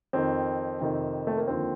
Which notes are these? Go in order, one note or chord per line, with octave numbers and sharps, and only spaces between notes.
F2 D#3 C4
F2 C3 D#3
A3
A#3
D#2 D3 F3 C4